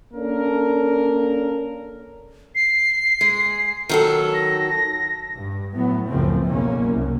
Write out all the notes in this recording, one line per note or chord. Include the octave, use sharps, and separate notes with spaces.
A#3 C#4 D4 A4 A#4
C7
G#3
D#3 F#3 A4
A#6
G2
A2 F#3 B3
C#2 F#2 A2 C#3 F3 C4
F#1 B1 E2 B2 A#3 C#4
C2